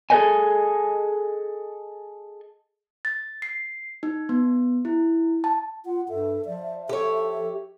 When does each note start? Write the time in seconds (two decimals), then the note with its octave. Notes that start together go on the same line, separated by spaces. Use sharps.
0.10 G#4 A4 B4 C5 D#5 G#5
3.05 A6
3.42 C7
4.03 D#4
4.29 B3
4.85 E4
5.44 A5
5.85 F4 F#5
6.09 G2 A4 E5
6.45 F3 D5
6.89 G4 A4 C#5